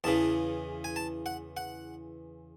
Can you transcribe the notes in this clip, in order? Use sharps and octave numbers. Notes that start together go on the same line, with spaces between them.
E2 C#3 E3 A5
G#5
A5
F#5
F#5